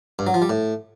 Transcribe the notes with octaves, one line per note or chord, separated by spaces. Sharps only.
G2
F#3
F3
G3
A2